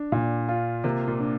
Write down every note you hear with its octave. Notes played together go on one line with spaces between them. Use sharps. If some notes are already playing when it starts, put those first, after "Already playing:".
Already playing: D4
A#2
F4
C3 A#3
A#2
D4